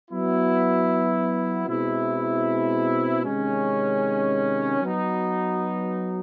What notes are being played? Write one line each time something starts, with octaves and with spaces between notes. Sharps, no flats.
F#3 B3 E4
B2 G#3 C4 E4
C3 D#3 G#3 C#4
F#3 B3 D#4